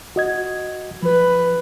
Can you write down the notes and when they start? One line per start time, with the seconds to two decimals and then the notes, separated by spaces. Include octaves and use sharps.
0.16 F#4 D#5 G#6
1.03 F3 B4